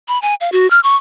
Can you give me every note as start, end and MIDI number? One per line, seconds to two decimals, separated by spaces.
0.08 0.20 83
0.22 0.35 80
0.41 0.50 77
0.52 0.69 66
0.71 0.80 89
0.83 0.96 85